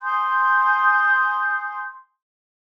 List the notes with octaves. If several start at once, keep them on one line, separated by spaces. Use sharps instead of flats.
G#5 C6 D#6 G6